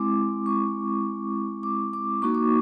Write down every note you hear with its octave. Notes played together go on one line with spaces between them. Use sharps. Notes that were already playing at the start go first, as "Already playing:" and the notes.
Already playing: G#3 C4 E4 D6
C#6
D6
D6
A#3 D#4 F#4 C#6
D6